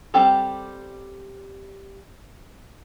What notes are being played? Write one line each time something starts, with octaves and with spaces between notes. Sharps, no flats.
G3 C4 G4 A4